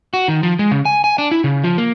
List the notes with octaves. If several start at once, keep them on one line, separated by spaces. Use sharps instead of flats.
F#4
D#3
F3
G#3
C#3
G#5
G#5
D4
E4
C#3
F3
A#3